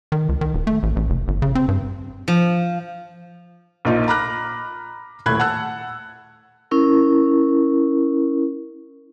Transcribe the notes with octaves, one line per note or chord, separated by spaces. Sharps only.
D#3
C#2
D#3
D#1
A3
A1
A1
F1
G1
C#3
C4
G2
F3
A#1 A#3 D#4 F4
A#5 B5 D6 F6 F#6 A#6
D#1 A2 B5 F#6 G#6
F#5 A5 E6 F#6
C#4 E4 A#4